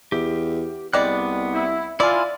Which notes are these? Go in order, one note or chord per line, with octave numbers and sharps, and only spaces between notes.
E2 G4
C2 G3 G#3 B3 D5 F#6
E4
E4 F4 D5 G#5